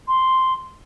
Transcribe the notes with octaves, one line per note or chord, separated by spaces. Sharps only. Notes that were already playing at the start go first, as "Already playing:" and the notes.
C6